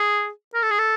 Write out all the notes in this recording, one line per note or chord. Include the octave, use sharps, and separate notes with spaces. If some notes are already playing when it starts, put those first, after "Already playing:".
Already playing: G#4
A#4
A4
G#4
A4